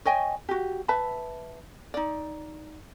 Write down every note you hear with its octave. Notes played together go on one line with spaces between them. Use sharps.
C#5 D#5 G5 G#5
F#4 G4
B4 E5 A5 B5
D#4 D5